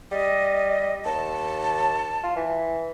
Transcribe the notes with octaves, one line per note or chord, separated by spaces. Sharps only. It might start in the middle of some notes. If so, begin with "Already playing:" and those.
G3 D#5
D#2 A5
F4
E3